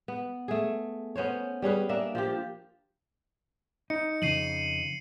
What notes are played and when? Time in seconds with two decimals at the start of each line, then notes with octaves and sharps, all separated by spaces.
0.08 B3
0.48 A3 G#4
1.16 B3 C#4 C5 C#5
1.62 G3 C#4 G#4 B4
1.89 A#3 D4 E5
2.15 F3 F4 G4
3.90 D#4 C#7
4.22 F2 C#3 C7 D#7 F#7